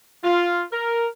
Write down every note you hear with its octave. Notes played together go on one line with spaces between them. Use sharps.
F4
A#4